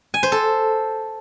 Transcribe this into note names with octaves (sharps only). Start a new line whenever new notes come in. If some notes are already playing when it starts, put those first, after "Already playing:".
G#5
C5
A4